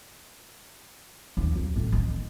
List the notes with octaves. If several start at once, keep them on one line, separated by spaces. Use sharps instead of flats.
D#2
D#2
A2
D#3